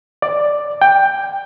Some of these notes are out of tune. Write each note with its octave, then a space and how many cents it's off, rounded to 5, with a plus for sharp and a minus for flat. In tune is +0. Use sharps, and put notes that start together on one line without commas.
D5 +5
G5 +10